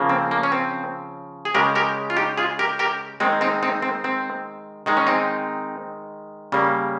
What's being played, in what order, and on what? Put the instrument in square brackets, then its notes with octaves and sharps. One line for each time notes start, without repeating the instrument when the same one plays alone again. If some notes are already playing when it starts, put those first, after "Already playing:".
Already playing: [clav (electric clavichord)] C#3 F3 A#3
C4
A#3
C#4
C4
G#4
C#3 G#3 G4 A#4
G4 A#4
F4
D#4 G4
F4 G#4
G4 A#4
G4 A#4
D#3 G#3 C4 D#4
C4 D#4
C4 D#4
C4
C4
D#3 G#3 D#4
C#4
C4 D#4
C#3 G3 A#3